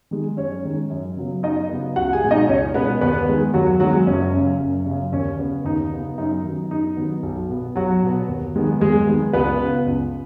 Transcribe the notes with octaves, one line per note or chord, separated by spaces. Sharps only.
D#3 G#3
F#2 C#4 C#5
D#3 G#3
F#2
C#3 F#3 B3
F#2 D#4 D#5
C#3 F#3 B3
C#2 F#4 F#5
G#4 G#5
B2 G#3 B3
D#4 D#5
C#2 C#4 C#5
B2 G#3 B3 B4
D#2 B3 B4
D#3 G#3 B3
D#2 F#3 F#4
D#3 F#3 G#3 B3 F#4
F#1 C#4
F#2 C#3
F#1
F#2 C#3
D#2 C#4
C#3 B3
D#2 D#4
C#3 B3
F#2 D#4
D#3 F#3 B3
F#2 D#4
D#3 F#3 B3
B1
B2 B3
B1 F#3 F#4
B2 B3
D#2
D#3 G#3 B3
D#2 G#3 G#4
D#3 G#3 B3
C#2 B3 B4
C#3 B3
C#2